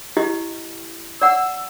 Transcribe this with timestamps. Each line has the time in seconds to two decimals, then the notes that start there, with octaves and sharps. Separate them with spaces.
0.17 E4 G4 D#5
1.22 D5 F#5 E6